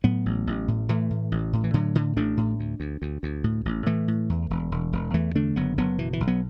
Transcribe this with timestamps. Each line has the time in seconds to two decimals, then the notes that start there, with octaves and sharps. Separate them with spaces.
0.04 A2 F#3 B3
0.26 A1
0.47 A1
0.68 A2
0.89 A2 E3 A3
1.11 A2
1.32 A1
1.53 A2
1.64 E3
1.74 A2 D3 F#3
1.95 A2 D3
2.17 A1 A3 D4
2.37 A2
2.59 D2
2.80 D2
3.02 D2
3.23 D2
3.44 A2
3.65 A1
3.86 A2 E3 A3
4.08 A2
4.29 E2
4.50 E1
4.72 E1
4.93 E1
5.14 E2 E3 A3
5.35 D3 A3 D4
5.56 F#1 F#3 B3
5.77 F#1 F#3 B3
5.98 B2 E3
6.13 E3
6.20 B1
6.28 F#3 B3